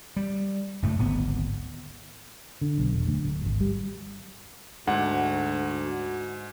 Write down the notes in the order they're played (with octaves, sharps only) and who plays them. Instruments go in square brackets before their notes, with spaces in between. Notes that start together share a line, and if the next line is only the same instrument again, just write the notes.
[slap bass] G3
F#1 A2 A3
D1 G#1 B3
[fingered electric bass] D3
B1
E1
D2
D1
G#1
G3
[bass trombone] D2 [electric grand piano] G#2 [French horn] F#4 [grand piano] F#5